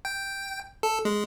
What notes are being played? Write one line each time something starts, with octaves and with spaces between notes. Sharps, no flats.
G5
A4
G#3